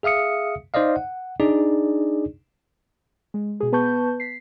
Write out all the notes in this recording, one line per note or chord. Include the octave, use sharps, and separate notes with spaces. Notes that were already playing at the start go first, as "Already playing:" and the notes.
G#4 E5 F5 D#6 C#7
D#4 C5 D5 D#5 F5
F#5
D4 D#4 G#4 D5
G#3
B2 G#4
B3 B4 A5 C#6 G6
B6 C7